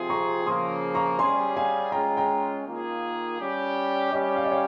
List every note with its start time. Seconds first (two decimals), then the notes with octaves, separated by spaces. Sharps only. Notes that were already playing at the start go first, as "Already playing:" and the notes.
Already playing: C3 F3 C4 F4 G#4
0.10 A#5 C#6
0.46 C#3 F3 A#3 C6 D#6
0.95 A#5 C#6
1.19 G3 C#4 G#4 G#5 C6
1.57 F5 G#5
1.92 G#3 C#4 F4 G5 A#5
2.17 G5 A#5
2.66 D#3 A#3 F4 G#4
3.39 G3 C#4 G4
4.12 G3 C#4 G4 D#5 G5
4.36 F5
4.44 D#5
4.51 C#5 F5